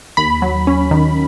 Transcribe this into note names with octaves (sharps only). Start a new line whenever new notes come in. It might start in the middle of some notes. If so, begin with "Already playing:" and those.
D#2 B5
F#3
C#4
D#3